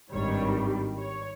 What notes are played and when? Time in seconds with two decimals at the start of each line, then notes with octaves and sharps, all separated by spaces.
0.12 G#1 G2 D#3 G3 C#5
1.00 C#5